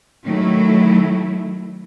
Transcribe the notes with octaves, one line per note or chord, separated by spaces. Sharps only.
D#3 F#3 A3 E4